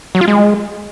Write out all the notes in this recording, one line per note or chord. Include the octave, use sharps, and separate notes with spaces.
F#3
F4
G#3